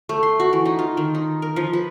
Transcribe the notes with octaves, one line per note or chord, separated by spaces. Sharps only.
A3
C6
F#4
E3
D#4
F4
D#3
D#4
A#4
F3
B4